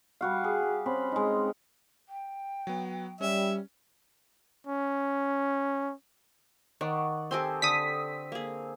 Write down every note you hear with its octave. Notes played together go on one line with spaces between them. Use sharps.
G3 F#4 F5
G#4
G4
C4 C#4 B5
G#3 D#4
G5
F#3 B3
G3 C#4 E5
C#4
D#3 D5 F#5 C#6
C4 G4 A4 D#5 G#5 C6
D3 D#6 B6
A#3 G#4